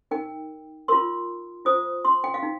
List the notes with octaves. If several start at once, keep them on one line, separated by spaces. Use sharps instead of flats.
D#4 A#4 G5
F4 A#4 C6
F4 C5 D#6
C6
G5
F5
D#4